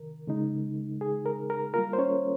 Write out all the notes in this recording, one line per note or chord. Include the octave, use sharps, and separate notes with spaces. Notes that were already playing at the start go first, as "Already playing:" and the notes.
Already playing: C3 D#3 A#4
C#3 G#3 D#4
G#4
A#4
A#4
G3 A#3 F4 A#4
C5
C#4 C#5